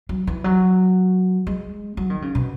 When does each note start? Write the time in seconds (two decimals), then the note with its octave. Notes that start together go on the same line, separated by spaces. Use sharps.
0.09 F#3
0.27 E3
0.44 F#3
1.47 G#3
1.97 F#3
2.10 D#3
2.22 C#3
2.35 B2